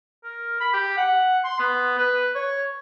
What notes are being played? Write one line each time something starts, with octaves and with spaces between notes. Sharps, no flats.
A#4
B5
G4
F#5
C6
B3
B4
C#5